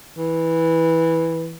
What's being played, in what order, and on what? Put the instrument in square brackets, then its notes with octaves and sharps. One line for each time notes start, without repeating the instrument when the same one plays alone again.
[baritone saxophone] E3